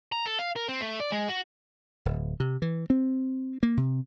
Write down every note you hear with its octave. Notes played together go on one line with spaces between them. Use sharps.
A#5
A4
F5
A#4
C4
A3
D5
G#3
F#4
D1
C3
E3
C4
A#3
C3